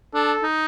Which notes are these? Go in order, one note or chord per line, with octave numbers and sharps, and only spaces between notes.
D4 A4
D#4